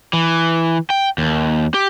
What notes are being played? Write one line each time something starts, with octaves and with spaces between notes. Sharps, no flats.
E3
G5
D#2
G4